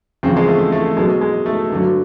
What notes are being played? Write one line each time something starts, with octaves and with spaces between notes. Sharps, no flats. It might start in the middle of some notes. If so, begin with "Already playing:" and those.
E2 C#3 F3 C4
G#3
A3
A3
B2 F#3 G#3
G#3
A3
G2 D3 F#3